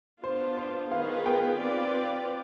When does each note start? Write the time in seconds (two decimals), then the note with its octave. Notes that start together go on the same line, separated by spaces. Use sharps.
0.23 B3 D4 F4 C5
0.57 C5
0.92 D#3 B3 F4 G#4 B4 F5
1.26 G5
1.60 C4 F4 B4 D5